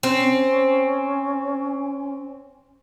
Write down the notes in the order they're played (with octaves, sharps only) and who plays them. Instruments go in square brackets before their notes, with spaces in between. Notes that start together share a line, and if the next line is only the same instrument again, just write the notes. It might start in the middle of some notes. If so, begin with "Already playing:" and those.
[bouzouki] C4 [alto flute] C#4